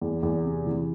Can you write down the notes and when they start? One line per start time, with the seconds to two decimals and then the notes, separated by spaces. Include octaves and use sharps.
0.01 E2
0.23 E2
0.44 C3
0.67 E3